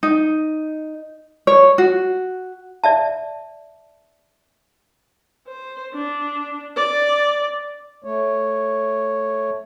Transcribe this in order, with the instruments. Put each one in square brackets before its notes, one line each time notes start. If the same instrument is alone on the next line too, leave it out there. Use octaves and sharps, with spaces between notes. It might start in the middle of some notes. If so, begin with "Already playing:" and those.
[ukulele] D#4
C#5
F#4
[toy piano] D5 E5 A5
[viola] C5
D4
D5
[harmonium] A3 C#5